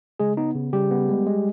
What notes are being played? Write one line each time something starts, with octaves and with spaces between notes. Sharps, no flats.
C#3 G#3 G#4
B3 D#4
C#3
C#3 G3 G4
B3
G#3
G#3